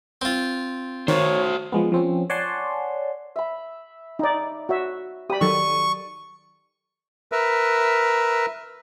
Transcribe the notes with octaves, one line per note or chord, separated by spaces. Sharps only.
C4 F4
D#3 F#4 C5 C#5
F3 G#3 B3
F3 C4 C#4
C#5 D5 F#5 G#5 A5 C6
E5 B5
D#4 D5
F#4 C#5 E5
G4 D5 B5 D#6
D#3 F#3 A4 C#6
A#4 B4 E5